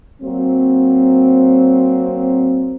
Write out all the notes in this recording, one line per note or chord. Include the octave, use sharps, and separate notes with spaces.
F#3 A#3 C4